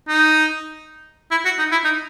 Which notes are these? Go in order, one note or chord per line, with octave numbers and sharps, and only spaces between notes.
D#4
E4
F#4
D#4
E4
D#4